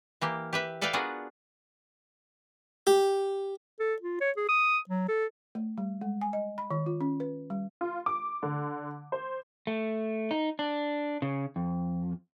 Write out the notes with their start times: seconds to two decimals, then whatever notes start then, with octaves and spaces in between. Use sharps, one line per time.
0.21 E3 A#3 G4
0.53 G4 B4 E5
0.81 A4 B4 D5 E5 F5 G5
0.93 B3 D4 F4 F#4 G#4 A#4
2.87 G4
3.80 A4
4.02 F4
4.21 C#5
4.37 G#4
4.49 D#6
4.89 F#3
5.08 A4
5.55 A3
5.78 G3
6.01 G#3
6.21 G#5
6.33 D#5
6.58 B5
6.71 D#3
6.86 F4
7.01 C#4
7.20 B4
7.50 G3
7.81 F4
8.06 D6
8.43 D3
9.12 C5
9.67 A3
10.31 D#4
10.59 D4
11.22 C#3
11.56 F2